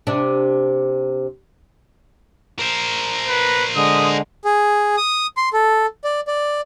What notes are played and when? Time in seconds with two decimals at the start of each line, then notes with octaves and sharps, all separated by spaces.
0.07 C3 D4
2.59 A#4 C5
3.28 B4
3.76 D3 G#3 D#6
4.45 G#4
4.97 D#6
5.37 C6
5.53 A4
6.04 D5
6.27 D5